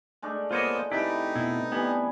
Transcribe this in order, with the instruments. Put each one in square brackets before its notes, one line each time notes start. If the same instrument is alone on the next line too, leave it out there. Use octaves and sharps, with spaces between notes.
[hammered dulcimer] G#3 A3 D4
[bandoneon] A#3 B3 C5 [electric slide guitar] F4 C#5 D#5
[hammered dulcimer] C3 A4 B4 [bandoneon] D#4 [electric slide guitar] E4 G4
[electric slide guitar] B2 E4
[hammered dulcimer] E3 G3 G#5 [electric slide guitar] B3